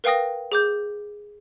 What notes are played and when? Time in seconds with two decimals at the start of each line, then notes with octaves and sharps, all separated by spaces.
0.04 A#4 B4 F5 G5 D#6 A#6
0.52 G#4 D6 G6